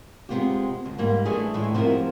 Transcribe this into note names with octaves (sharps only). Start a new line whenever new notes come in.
C3 D#3 G#3 B3 F4 G4
D2
G#2 G3 A#3
E3 A3 D4 G#4
A2 E3 G#3
C3 F3 B3 E4 A#4